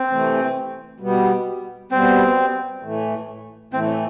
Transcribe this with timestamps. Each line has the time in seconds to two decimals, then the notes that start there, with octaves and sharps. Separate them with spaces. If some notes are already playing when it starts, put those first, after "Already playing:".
Already playing: C4
0.09 C3 E3 A3
1.00 B2 G3 B3
1.91 B2 G3 B3 C4
2.83 A2 E3 A3
3.73 A2 E3 A3 C4